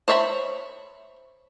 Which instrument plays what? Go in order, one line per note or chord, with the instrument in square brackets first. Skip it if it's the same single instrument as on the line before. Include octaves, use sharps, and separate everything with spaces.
[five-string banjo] C5 C#5 E5 A5 B5